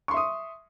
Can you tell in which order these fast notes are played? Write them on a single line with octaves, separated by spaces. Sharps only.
C#6 C6 E5 D#6